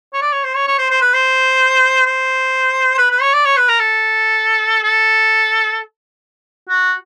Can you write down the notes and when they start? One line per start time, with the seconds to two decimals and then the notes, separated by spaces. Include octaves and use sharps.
0.14 C#5
0.22 D5
0.33 C#5
0.44 C5
0.56 C#5
0.67 C#5
0.79 C5
0.91 C5
1.01 B4
1.14 C5
2.07 C5
2.98 B4
3.11 B4
3.22 C#5
3.34 D5
3.45 C#5
3.57 B4
3.69 A#4
3.80 A4
4.83 A4
6.69 F#4